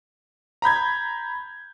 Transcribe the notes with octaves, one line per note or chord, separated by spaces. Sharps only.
A#5 B5 G6 G#6